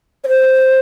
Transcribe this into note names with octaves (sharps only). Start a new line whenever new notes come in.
C#5
C5